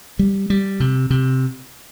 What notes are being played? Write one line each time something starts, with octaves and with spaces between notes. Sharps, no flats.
G3
G3
C3
C3